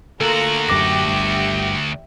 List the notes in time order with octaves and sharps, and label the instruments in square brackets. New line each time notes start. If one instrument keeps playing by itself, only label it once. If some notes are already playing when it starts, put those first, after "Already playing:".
[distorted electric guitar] D2 F#4 [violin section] A#3 F4 A#5 [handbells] A4
[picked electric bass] D1 F#2 [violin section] G4 E5 G5 [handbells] D6 A#6
[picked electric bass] G1 G2